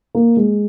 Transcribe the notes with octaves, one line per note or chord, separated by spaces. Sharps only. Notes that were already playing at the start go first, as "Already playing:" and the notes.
A#3
G#3